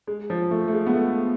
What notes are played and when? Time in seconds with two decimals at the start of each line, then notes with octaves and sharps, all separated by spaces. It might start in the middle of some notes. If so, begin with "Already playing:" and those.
0.07 G#3
0.30 F3
0.51 A3
0.68 A3
0.73 G#3
0.86 B3
0.94 A3